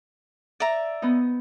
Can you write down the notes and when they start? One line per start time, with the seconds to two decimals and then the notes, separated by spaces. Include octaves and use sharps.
0.60 D5 E5 A#5
1.02 B3 D#4